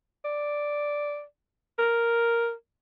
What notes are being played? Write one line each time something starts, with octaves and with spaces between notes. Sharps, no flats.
D5
A#4